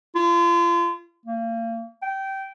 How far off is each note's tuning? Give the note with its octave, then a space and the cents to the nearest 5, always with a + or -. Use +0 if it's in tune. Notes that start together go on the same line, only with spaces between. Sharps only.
F4 -35
A#3 -35
G5 -20